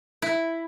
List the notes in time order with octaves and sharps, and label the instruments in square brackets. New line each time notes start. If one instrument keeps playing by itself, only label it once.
[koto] E4